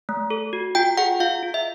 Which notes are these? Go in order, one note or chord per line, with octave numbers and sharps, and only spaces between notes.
A3
A4
F#4
F4 G5
G#4 F#5
F4 F5
F4
E5